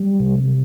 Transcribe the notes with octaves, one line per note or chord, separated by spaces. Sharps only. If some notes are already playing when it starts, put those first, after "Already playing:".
Already playing: G3
C3